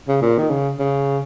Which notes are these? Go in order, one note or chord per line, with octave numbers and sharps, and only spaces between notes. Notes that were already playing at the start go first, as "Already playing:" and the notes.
C#3
A#2
D#3
C#3
C#3